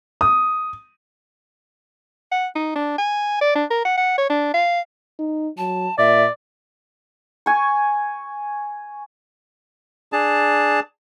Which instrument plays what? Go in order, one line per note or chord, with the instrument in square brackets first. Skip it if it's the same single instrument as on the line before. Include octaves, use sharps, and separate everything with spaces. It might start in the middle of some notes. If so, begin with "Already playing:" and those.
[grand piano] D#6
[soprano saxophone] F#5
D#4
D4
G#5
D5
D4
A#4
F#5
F#5
C#5
D4
F5
[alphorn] D#4
[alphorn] F#3 [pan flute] A5
[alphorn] A#2 [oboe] D5 [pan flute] E5
[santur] G#5 C#6
[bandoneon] D4 G#4 A5